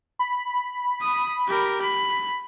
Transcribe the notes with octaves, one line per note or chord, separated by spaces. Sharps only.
B5
D#6
G4 A#4
B5